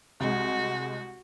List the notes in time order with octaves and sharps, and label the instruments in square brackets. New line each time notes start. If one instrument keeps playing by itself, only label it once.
[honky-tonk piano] C2 G#3 [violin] F#4